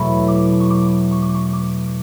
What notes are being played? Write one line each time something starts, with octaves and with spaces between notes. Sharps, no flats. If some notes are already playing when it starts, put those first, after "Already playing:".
Already playing: E2 B2 F#3 A3 B5 C#6
D6
C#6
D6
C#6
D6
C#6
D6